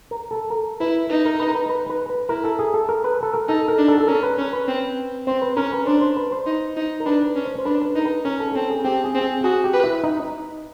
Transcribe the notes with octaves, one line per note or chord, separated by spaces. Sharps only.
A#4
A4
A#4
E4 B4
D#4 B4
A#4
B4
A#4
B4
B4
B4
B4
E4 A#4
A4
G#4
A4
A#4
B4
A4
A#4
D#4 A4
A#4
D4
A4
A4
C#4 A#4
B4
C#4
B4
C4
C4 C5
B4
C#4 A#4
B4
D4 C5
C5
B4
C5
D#4
D#4
A#4
D4 B4
B4
C#4
C5
C5
D4 B4
B4
D#4 A#4
B4
C#4 A#4
A4
C4 A4
G#4
C4 G4
G#4
C4
G#4
F#4 G#4
G4
B4
E4
D#4